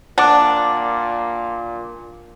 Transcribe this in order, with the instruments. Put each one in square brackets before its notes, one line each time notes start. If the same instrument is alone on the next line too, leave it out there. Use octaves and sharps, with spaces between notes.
[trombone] A#2 [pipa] D4 [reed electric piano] F#5 A5 D6